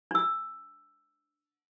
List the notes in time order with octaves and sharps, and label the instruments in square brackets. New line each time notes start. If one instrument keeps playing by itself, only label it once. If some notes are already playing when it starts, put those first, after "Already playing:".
[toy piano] D4 E6